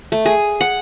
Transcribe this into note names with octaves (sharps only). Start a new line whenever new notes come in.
A3
G#4
F#5